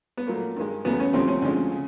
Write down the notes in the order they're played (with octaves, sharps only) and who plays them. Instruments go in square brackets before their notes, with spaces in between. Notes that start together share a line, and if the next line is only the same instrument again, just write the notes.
[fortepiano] B3
A#2 F#3 A3 A#3
G2 D#3 G#3
E2 C#3 F#3 A3 B3
C#4
D2 C3 F3 A3 C4
C#4
D2 D3 F3 G#3
C#3